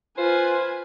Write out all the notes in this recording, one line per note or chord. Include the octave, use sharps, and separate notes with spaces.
F4 B4 C5 G#5